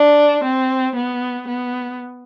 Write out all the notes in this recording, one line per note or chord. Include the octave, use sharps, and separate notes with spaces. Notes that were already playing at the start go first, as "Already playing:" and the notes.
Already playing: D4
C4
B3
B3